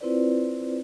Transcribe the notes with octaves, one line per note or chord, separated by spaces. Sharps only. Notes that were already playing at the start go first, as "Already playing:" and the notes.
C4 E4 F4 B4 C5 D5